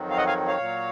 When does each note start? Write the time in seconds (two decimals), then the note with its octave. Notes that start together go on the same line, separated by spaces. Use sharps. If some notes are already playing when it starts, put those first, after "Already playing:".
Already playing: F2 D#3 F#3
0.10 F5
0.17 D#5 F#5
0.27 F5 G#5
0.47 C#5 F5
0.58 A#2 F#3